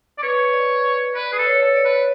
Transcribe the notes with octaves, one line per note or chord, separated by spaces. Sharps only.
D5
B4 C#5
D5
B4 D5
G#4
A4
C#5
A4
D5
B4